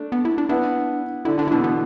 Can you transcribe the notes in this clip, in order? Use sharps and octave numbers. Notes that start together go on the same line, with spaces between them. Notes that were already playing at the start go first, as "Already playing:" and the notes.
Already playing: A3 D4
B3
E4
D4
B3 D4 E4
D3 E4
D3 D4
E4
B2 E3 D4
B3